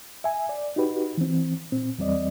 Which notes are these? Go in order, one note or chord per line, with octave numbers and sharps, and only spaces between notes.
E5 G#5
D5
D#4 F#4 G4 B4
E3 C4
A#2 C4
E2 G3 C4 D5 D#5